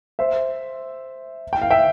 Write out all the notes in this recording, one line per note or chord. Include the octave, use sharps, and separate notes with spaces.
C5 E5
G5
F5
E5 G5